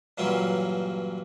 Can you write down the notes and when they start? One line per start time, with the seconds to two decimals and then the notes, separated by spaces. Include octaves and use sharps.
0.18 G2 A#2 E3 F#3 C#4 F4